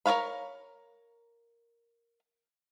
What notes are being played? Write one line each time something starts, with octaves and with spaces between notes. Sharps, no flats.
A#4 B4 C#5 F5 B5